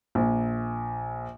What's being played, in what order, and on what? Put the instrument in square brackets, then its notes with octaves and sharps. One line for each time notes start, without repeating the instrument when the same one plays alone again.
[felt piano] A#1